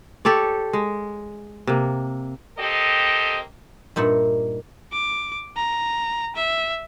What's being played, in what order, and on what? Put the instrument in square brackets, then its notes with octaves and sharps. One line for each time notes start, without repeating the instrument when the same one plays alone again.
[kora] G4 A4 C#5 D5
G#3
C3 A#3
[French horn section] A#3 C4 G4 A4 D#5
[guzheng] G2 A#2 D#4 E5 F#5
[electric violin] D6
A#5
E5